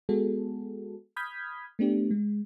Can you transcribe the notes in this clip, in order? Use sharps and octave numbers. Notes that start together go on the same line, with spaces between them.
G#3 B3 F#4 G#4 A4
B5 D#6 F6 G6 G#6 B6
A3 B3 D4 G4
G#3